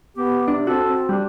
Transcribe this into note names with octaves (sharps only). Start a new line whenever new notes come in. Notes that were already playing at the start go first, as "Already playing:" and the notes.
B3 G4
C3 D4
C4 F#4 A4
C4
G3 D4